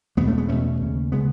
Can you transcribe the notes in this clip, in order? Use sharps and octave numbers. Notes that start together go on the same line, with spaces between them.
E2 B2 G#3 B3
A3 C#4
G#3 B3
E2 B2 A3 C#4
D#2 C#3
C#3 G#3 B3